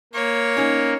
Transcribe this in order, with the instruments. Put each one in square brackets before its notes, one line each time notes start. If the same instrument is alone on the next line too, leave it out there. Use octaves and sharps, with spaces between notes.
[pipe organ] A#3 [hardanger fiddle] C#5
[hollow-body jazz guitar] C#4 D#4 G#4